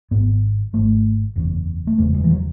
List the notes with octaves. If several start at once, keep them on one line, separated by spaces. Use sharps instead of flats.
G#1 G#2 B3
G#1 G#2 A3
F#1 E2 C#3
A3
F#1 E2 C#3 G#3
G#3
E3
F#3